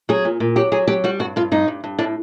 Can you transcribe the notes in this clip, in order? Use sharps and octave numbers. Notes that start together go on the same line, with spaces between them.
F#3 G#4
A#2
A#2
F#3 G4
F#3 G#4
F#3 G4
G3 F#4
G2 F#4
G2 F4
G2 D#4
G2
G2
A2 D4